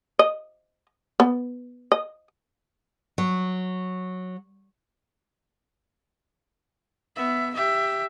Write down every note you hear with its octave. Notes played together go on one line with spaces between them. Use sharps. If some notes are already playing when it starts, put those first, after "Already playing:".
D#5
B3
D#5
F#3
B3 E5
G4 E5